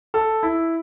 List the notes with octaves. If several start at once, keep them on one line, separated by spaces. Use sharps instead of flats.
A4
E4